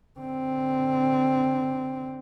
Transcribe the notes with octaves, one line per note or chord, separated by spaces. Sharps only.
D3 C4